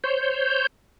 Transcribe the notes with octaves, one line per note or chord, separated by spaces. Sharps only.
C5 C#5 G6